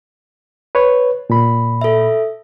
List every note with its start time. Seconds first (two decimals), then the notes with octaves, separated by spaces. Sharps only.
0.75 B4 C#5
1.30 A#2 B5
1.81 A4 E5